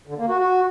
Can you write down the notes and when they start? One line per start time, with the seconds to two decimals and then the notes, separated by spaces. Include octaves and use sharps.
0.07 D3
0.18 A#3
0.29 F#4
0.39 F#4